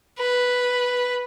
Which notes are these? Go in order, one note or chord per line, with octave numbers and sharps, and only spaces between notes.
B4